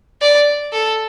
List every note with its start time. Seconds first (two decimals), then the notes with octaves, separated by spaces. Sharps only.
0.22 D5
0.73 A4